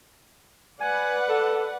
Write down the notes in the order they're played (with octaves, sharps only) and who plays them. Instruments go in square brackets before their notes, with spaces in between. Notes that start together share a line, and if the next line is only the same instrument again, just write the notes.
[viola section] B4 D5 F#5 [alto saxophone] G#5
[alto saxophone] A4